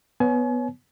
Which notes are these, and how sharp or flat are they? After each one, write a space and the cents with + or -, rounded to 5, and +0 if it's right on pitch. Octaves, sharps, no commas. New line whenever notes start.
B3 +0 C#5 +0 G#5 +35